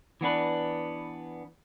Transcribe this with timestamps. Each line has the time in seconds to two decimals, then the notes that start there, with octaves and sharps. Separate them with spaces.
0.21 E3 B3 D4 B4